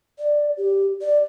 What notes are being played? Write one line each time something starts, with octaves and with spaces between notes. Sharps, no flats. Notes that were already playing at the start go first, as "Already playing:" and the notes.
D5
G4
D5